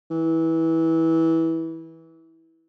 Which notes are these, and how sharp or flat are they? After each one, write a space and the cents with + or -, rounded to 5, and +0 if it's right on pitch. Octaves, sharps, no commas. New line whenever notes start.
E3 -20